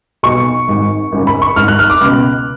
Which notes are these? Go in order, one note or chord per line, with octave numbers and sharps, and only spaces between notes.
B1 B2 C#6
G#1 G#2
G#1 F#2 C#3
B5
C#6
G#1 G#2 F6
F#6
F6
D6
C#2 B2